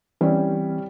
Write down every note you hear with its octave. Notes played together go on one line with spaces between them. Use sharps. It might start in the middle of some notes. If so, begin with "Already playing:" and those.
E3 G3 C4 C#4